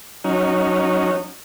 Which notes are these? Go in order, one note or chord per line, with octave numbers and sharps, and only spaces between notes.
F#3 C#4 D#4